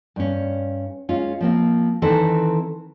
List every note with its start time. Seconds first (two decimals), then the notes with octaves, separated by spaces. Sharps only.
0.16 G2 C#4
1.09 G#3 C#4 F4
1.41 F3 A#3 C4
2.02 D#3 E3 C4 A4 B4 C5